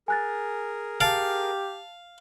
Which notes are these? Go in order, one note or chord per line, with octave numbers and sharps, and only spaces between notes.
G#4 A#4 G#5 F#6 A6
G4 F5 A5 A6 D7